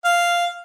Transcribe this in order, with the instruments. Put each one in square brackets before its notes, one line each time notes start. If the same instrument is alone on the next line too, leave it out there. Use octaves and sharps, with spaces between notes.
[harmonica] F5